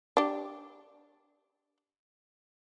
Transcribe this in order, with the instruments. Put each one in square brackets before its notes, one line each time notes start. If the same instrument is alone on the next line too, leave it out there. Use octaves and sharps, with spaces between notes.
[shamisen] D4 G4